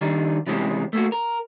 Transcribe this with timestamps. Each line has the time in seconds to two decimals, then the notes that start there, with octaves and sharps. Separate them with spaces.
0.01 D#3 G3 D4 D#4
0.47 C3 E3 G3 G#3 C4 C#4
0.93 A3 A#3 F#4
1.12 A#4